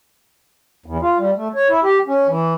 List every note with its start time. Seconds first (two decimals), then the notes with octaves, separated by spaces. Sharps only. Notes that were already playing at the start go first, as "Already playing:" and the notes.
0.86 E2
1.02 F4
1.18 G3
1.36 A3
1.55 C#5
1.69 E4
1.83 G4
2.08 C#4
2.28 E3